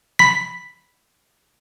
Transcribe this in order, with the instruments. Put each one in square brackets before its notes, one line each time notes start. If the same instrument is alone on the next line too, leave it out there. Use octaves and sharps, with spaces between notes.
[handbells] B5 B6